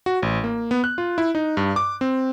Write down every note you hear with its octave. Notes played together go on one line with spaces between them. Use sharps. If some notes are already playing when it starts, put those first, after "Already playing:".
F#4
A1
A#3
B3
F#6
F4
E4
D#4
G2
D6
C4